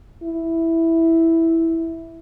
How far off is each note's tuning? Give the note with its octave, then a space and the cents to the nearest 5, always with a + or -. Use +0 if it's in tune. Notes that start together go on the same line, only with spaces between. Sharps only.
E4 -5